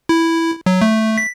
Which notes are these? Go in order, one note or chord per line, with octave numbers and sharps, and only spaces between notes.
E4
F#3
A3
B6